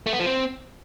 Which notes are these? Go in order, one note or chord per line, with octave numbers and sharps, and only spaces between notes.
A3
B3
F3
C4